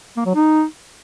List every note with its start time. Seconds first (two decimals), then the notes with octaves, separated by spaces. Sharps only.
0.17 A#3
0.26 F#3
0.35 D#4